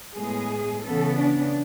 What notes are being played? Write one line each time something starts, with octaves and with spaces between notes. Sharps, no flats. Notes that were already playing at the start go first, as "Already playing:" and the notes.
A2 G#3 B3 G#4
C#3 E3 B3 A4
D4